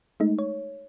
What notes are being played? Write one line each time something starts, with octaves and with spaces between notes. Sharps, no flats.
G#3 A3 D#4
C#5